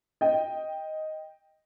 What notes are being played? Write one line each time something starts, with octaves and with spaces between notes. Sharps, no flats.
D#5 G5